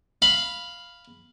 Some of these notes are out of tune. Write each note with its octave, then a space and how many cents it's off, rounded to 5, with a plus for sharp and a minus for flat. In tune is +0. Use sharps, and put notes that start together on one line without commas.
F5 +0 B5 +0